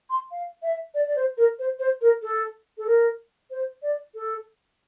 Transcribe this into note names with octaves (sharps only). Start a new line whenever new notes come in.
C6
F5
E5
D5
D5
C5
A#4
C5
C5
A#4
A4
A4
A#4
C5
D5
A4